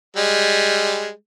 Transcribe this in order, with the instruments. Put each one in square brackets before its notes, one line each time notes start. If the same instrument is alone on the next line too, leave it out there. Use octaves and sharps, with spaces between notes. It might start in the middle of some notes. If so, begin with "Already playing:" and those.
[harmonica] G3 G#3